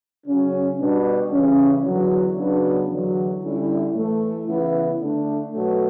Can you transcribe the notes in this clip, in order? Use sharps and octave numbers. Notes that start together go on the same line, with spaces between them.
C#3 F#3 C#4
B2 G3 D4
C#3 E3 G3 C#4
E2 D3 F#3
C#3 F#3 B3 D4
E2 D3 F#3
D3 G3 C#4 E4
A2 E3 A3
C#3 E3 B3 E4
D3 A3 D4
B2 F#3 A3